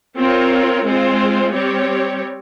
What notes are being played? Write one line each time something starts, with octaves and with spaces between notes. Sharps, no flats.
C4 F4 A#4 C#5
G#3 C4 F4 C5
G3 C4 G4 C#5